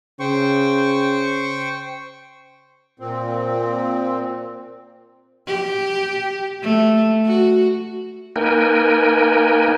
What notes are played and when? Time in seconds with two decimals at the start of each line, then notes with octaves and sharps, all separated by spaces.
0.20 C#3 C5 G5 C#6
3.00 A#2 C4
5.47 G4
6.63 A3
7.25 F#4
8.36 A#3 D#4 A#4 B4 G5 G#5